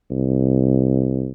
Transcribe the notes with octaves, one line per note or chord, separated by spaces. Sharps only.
C2